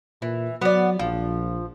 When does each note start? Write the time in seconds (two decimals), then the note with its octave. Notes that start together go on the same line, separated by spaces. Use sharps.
0.22 A#2 E3
0.61 F#3 B3 D5
0.99 A#1 F3